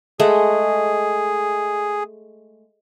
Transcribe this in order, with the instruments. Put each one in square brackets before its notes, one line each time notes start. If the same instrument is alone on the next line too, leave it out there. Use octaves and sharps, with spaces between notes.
[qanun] G#3 A3 F#5 [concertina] G#4